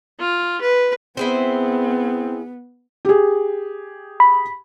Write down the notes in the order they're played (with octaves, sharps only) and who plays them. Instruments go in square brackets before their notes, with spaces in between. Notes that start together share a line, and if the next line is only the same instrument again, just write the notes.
[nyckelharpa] F4
B4
[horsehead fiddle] B3 [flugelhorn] C4 [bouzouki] E4 G#4 C5
[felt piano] G4 G#4
[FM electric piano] B5